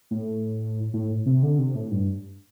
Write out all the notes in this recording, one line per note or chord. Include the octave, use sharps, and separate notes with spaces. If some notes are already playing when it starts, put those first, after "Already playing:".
A2
A2
C3
D3
C3
A2
G2